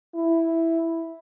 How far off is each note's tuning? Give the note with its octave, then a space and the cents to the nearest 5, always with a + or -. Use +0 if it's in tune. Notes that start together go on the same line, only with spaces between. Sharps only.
E4 +0